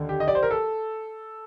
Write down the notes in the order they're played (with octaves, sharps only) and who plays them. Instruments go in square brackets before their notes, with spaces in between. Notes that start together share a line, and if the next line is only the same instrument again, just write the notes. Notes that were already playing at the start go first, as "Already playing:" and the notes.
Already playing: [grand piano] D#2 D3
G4
D#5
D5
C5
A#4
A4